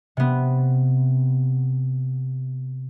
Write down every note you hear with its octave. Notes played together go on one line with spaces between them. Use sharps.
C3 B3